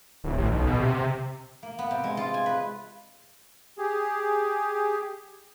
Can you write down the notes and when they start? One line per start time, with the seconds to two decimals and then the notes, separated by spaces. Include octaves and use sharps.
0.24 D1
0.38 A1
0.52 B1
0.67 B2
0.80 C3
0.94 C3
1.63 A#3
1.79 B3
1.91 C3
2.04 G#3
2.17 F4
2.34 G#5
2.46 B4
3.78 G4 G#4